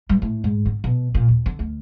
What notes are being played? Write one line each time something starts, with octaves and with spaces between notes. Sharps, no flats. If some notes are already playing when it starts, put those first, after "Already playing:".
G2
A2
G#2
D3
B2
A#2
D#2
D3
D2